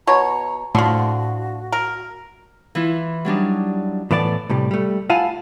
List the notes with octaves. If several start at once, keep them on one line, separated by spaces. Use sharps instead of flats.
B2 C#5 A#5
A2 D3 F3 F#4
A#4
E3 E4 F4
F#3 G3 D4 D#4
A2 E3 B3 D5 D#5 A5
A2 C3 G3
G3 A3
E4 F4 F5 F#5 G#5 A5